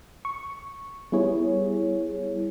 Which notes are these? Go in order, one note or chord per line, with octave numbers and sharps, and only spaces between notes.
C#6
G3 B3 E4 G#4 C#5